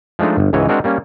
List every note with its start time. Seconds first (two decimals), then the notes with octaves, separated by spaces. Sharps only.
0.19 F3 G#3 A3 D4 D#4
0.38 G1
0.53 C#2 G#2 E3 C#5 D#5
0.69 G#3 C4 D4 F#4 A#4
0.84 G3 A#3 C#4